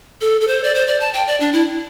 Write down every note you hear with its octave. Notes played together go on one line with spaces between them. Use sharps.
A4
A4
C5
D5
C5
D5
A5
G5
D5
D4
E4